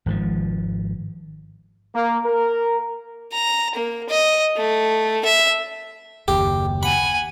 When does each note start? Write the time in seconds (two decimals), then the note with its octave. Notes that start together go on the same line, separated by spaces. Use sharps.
0.06 G#1 G#2 B2 F3
1.95 A#3
2.25 A#4
3.32 A#5
3.75 A#3
4.09 D#5
4.57 A3
5.25 E5
6.28 F#1 D#2 G4
6.83 F#5 G#5 B5